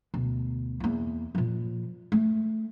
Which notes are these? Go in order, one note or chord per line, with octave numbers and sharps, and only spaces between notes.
D2 B2
E2 A#3
A#2 F3
A3